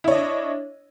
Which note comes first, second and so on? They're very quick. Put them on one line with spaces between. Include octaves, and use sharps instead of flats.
E4 C#5 D#5 D4